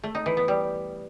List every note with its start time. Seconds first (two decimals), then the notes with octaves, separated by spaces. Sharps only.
0.04 A3
0.15 D#4
0.26 E3
0.37 B3
0.48 G3